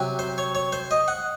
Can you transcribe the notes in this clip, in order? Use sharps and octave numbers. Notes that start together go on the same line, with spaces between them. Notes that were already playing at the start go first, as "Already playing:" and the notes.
Already playing: C3 F#3 C4
C5
C#5
C#5
C5
D#5
F#5